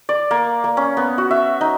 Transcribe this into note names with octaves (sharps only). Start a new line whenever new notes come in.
D5
A#3
A#3
C#4
B3
F#4
E5
D#4